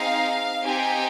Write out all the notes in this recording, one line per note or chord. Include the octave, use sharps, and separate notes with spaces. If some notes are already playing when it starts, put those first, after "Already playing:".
Already playing: C4 D#4 G#4 F5
C4 D#4 G4 G#5